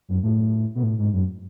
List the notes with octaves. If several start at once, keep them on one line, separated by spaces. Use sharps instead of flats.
F#2
A2
B2
A2
G#2
F#2